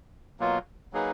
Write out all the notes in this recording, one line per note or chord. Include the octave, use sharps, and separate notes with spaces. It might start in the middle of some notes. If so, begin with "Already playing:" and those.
B2 F#3 A#3 F4
F#3 A#3 D#4 G#4 B4